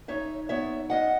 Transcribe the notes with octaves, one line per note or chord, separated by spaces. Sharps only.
D#4 C#5 E5
B3 C#5 E5
D#3 D#5 F#5